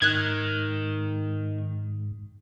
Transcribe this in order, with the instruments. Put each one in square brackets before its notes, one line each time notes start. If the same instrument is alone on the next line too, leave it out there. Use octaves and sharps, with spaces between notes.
[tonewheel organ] G#2 [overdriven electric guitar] D#3 [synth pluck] F#6 G#6